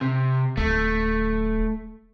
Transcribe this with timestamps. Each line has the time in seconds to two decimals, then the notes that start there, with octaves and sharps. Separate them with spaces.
0.01 C3
0.57 D1 A3